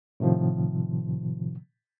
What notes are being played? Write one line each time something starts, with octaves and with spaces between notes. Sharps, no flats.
A2 C3 D#3 F3